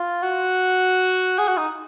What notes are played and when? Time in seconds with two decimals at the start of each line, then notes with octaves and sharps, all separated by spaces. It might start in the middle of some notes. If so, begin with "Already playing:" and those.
Already playing: F4
0.23 F#4
1.38 G#4
1.48 F#4
1.57 D#4